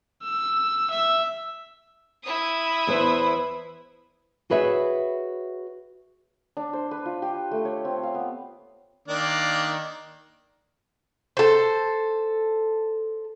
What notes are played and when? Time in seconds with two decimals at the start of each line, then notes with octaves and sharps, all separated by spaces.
0.23 E6
0.91 E5
2.23 E4 D#6
2.87 E2 B4 C5
4.50 F#4 G#4 B4 C#5 E5
6.57 D4
6.73 C5
6.91 B4
7.06 F4
7.22 G4
7.51 A3
7.65 C#5
7.85 C4
8.03 F5
8.15 B3
9.08 D#3 A#3 D4
11.37 A4 C5